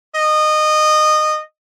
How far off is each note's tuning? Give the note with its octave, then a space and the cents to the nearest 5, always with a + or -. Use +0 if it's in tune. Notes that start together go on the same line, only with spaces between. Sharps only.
D#5 -20